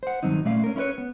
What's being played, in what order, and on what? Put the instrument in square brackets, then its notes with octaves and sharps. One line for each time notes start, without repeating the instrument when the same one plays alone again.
[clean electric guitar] C5 F#5
G2 D#3 F#3 C4 D#4
A#2 A3 C#4 D5 F5
C#4 A#4
C#4 E4 F#4 B4 C#5
B3